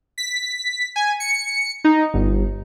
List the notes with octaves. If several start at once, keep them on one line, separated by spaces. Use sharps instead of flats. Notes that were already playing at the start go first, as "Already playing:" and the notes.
B6
G#5
C#7
D#4
G1